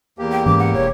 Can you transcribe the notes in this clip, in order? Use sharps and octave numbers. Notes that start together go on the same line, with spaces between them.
E2 A#3 G4
G5
G#2 E3 C#4 D6
F#5
E1 C#5